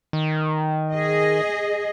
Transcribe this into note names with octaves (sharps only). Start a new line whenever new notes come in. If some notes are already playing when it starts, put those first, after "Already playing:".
D#3
G#4 D#5